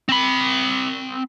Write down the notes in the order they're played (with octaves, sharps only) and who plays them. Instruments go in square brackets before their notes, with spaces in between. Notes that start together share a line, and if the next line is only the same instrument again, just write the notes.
[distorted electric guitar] C4 B5